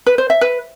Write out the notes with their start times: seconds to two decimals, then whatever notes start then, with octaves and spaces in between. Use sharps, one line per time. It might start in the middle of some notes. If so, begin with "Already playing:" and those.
0.06 B4
0.18 C5
0.30 E5
0.41 B4